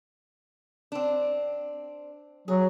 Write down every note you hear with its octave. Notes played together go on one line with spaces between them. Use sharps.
C4 D4
F#3 G#4